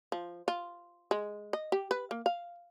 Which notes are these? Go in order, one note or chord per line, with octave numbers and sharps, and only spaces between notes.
F3
F4
G#3
D#5
G4
B4
A#3
F5